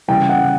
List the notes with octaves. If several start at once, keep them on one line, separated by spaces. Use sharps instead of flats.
C#3 E3 G3 G5
F#5